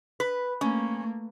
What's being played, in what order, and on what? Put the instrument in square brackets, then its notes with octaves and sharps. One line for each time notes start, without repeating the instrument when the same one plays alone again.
[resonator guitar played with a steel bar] B4
[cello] A3 A#3 [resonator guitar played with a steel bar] C#4